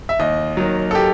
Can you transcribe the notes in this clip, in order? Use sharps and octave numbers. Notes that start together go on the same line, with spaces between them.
E5
D#2 D#5
D#3 F#3
A4
G4